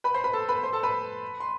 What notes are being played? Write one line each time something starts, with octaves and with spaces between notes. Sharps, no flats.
B4 B5
C5 C6
B4 B5
A4 A5
B4 B5
C5 C6
A4 A5
B4 B5
C6